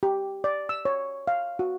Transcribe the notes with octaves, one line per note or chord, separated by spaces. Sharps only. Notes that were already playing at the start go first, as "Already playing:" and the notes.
G4
D5
E6
C#5
F5
F#4